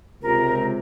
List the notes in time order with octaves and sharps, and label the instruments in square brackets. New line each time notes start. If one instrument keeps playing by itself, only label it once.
[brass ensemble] C#2 C3 [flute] A#4